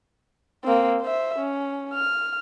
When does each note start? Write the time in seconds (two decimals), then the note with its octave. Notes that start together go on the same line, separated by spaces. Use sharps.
0.64 A#3 C4
1.01 C5 E5
1.39 C#4
1.94 F6